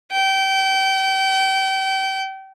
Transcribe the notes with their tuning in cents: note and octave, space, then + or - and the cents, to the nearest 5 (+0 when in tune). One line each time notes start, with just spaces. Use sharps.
G5 -30